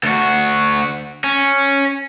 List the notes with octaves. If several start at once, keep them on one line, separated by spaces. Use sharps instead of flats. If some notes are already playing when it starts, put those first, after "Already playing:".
D2 F#4
C#4